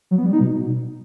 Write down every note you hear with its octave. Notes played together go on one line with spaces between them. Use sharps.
F#3
B3
G3
D#4
B2